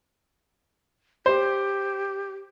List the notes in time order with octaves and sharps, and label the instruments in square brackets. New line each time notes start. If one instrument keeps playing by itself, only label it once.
[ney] G4 [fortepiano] C5